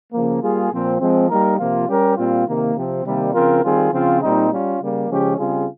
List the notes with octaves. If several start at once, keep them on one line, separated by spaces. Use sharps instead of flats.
C#3 F3 A#3
G3 A#3 F4 G#4
A#2 F3 C4
F3 G#3 C4
G3 A#3 D#4 A#4
C3 F3 A#3 F4
G3 C#4 G4 A#4
A#2 G3 C4 F4
C3 D#3 A#3
C3 F3 C4
C3 D#3 G3 A#3
C#3 F3 C4 F4 A#4
D#3 G3 C4 F4 G#4
C#3 F3 C4 F4
A#2 G3 C4 D#4
G3 C#4 F4
C#3 G3 A#3
C#3 F3 G#3 C#4 G4
C#3 G3 C4 F4 G#4